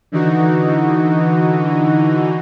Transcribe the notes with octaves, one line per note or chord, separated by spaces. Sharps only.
D3 E3 D#4 F#4